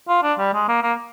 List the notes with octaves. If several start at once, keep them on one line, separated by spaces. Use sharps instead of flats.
F4
D4
G3
G#3
A#3
A#3